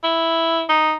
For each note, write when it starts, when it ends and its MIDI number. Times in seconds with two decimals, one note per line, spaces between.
0.04 0.64 64
0.69 0.94 63